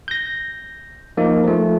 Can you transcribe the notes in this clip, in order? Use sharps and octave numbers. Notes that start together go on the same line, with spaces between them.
G6 A#6
F3 A#3 D#4
F3 A3